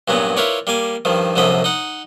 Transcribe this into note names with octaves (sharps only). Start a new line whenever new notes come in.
G2 A#2 F#3 B3 C#4
E4 F4 A#4 B4 C#5 D5
G3 A#3 G#5 D6
G2 D#3 F3
C2 F#2 D3 F3 D#5 B5
D#4 F#5